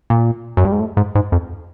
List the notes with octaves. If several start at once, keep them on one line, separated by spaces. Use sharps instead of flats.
A#2
F#2
G2
G#2
A2
G#2
G#2
F2